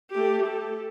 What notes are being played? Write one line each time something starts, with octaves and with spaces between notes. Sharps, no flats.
A3 G4
A4